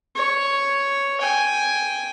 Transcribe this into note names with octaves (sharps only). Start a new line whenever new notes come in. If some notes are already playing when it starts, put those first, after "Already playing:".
C#5
G5 G#5